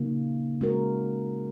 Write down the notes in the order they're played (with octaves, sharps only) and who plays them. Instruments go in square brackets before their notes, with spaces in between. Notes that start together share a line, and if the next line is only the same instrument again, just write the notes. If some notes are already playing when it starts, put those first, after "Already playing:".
Already playing: [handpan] C#3 F#3 A#3 D#4
G#3 C#4 F#4 A#4